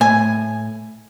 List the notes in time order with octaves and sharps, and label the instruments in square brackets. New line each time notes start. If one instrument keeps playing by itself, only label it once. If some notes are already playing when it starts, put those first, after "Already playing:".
[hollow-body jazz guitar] A2 [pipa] G#5